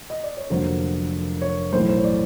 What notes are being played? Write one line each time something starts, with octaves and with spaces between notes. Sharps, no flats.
D#5
D5
C#5
F1 F2 D3 F#3 A#3 C5
C#5
B1 A2 E3 A3 C5
C5
C#5
D5